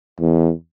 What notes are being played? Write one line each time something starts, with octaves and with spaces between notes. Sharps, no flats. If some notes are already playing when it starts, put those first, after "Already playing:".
E2